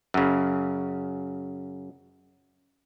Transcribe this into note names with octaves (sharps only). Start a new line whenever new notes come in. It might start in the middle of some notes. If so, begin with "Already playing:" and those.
F#2 C#3